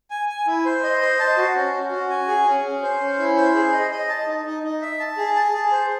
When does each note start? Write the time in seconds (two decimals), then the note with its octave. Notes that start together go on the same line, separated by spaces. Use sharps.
0.10 G#5
0.29 G#5
0.47 E4
0.65 C5
0.83 D#5
1.01 C5
1.19 A5
1.37 F#4
1.55 C#4
1.74 C#4
1.91 F#4
2.10 G#5
2.28 G#4
2.46 C#4
2.65 C#4
2.82 C5
3.00 C#4
3.19 E4
3.37 C5
3.54 G#4
3.72 D#5
3.91 D#5
4.09 A5
4.27 D#4
4.45 D#4
4.63 D#4
4.81 E5
5.00 A5
5.17 G#4
5.35 A5
5.54 G#4
5.72 C5